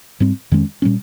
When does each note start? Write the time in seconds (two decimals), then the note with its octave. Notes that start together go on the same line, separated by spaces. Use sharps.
0.20 G#2 G3 C4
0.51 F2 D#3 G#3 C#4
0.82 A#2 G3 A#3 C#4